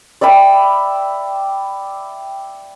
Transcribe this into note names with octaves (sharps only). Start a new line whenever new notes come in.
D5 E5 G5 B5